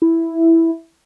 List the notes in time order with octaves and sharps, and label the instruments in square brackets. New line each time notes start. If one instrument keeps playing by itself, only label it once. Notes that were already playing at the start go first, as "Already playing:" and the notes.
[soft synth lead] E4